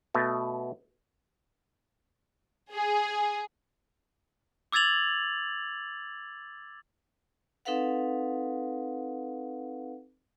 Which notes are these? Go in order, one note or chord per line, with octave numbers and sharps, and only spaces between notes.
B2 A3
G#4
D6 E6 G#6 A6 F7 F#7
C4 D#4 A4 B4 F5 F#5